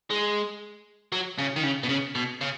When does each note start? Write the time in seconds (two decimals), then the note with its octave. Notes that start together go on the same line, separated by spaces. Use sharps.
0.10 G#3
1.12 F#3
1.38 C#3
1.56 D#3
1.63 C#3
1.83 B2
1.89 C#3
2.15 B2
2.41 C#3